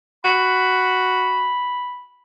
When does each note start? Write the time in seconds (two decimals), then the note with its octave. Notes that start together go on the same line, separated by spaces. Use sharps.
0.25 F#4 B5